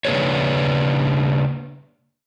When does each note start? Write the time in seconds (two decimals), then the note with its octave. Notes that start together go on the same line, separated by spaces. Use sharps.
0.05 C#3 A#3 D4 G#4 B4 C#5